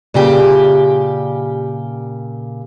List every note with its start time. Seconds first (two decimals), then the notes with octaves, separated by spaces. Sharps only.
0.14 A#2 C#3 G4